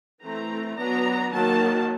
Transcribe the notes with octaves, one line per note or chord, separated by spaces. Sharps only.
E3 A3 C4 A#5
F#3 B3 D4 A#5
D#3 F#3 A#3 A5